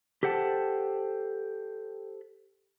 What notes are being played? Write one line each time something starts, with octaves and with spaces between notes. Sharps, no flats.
G4 A4 C5 F#5 G5 A5